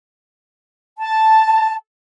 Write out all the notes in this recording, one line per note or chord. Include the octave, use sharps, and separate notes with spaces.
A5